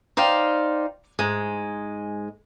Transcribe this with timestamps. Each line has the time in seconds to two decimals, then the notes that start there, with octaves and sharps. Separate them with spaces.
0.17 D#4 C5 D5 F5 G5
1.19 G#2 G#3